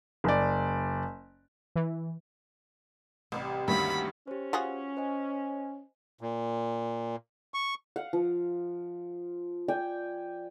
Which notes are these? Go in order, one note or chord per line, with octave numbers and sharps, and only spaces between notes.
F#1 D5
E3
A1 C3 G3 G4
D2 G2 D#3 A#3 C#4 B5
C#4 G4 C5
F4 F#4 G#4
C5 D#5 G#5
A#2
C#6
F5 F#5
F3
D5 G5 G#5